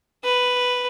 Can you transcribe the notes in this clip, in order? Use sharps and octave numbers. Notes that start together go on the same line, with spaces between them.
B4